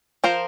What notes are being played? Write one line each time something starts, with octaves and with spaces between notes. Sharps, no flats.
F3 A#4 C5